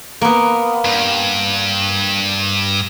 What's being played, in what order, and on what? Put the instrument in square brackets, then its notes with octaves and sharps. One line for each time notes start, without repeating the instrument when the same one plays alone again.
[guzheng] A#3 B3
[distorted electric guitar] G2